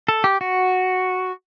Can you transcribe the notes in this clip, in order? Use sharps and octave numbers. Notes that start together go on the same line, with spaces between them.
A4
G4
F#4